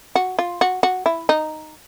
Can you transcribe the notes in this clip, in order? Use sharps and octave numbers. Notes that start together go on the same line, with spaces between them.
F#4
F4
F#4
F#4
E4
D#4